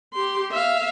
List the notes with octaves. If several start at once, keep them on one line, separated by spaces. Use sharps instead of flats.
G4 C6
E5 F5